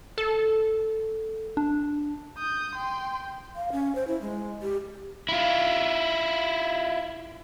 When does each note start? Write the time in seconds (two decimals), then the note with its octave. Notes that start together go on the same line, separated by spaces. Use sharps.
0.18 A4
1.57 D4
2.38 D#6 G6
2.76 G5 C6
3.56 F5
3.72 C#4
3.95 C5
4.07 E4
4.22 G#3
4.62 G4
5.29 E4 F4